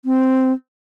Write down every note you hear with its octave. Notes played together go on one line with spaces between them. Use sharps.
C4